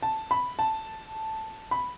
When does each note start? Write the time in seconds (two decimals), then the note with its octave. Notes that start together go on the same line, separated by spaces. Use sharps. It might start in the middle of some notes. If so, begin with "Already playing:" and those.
0.02 A5
0.31 B5
0.59 A5
1.71 B5